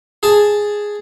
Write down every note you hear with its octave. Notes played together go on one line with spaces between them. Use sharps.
G#4 A5